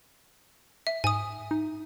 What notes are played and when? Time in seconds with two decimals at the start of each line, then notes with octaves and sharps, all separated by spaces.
0.87 E5
1.04 G#2 G#5 D#6
1.51 D#4